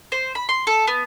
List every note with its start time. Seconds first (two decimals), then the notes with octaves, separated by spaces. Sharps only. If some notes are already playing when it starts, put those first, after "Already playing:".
0.12 C5
0.35 B5
0.49 C6
0.67 A4
0.88 B3